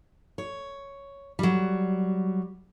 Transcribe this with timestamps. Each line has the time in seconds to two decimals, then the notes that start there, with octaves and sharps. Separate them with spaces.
0.38 C#5
1.39 F#3 G3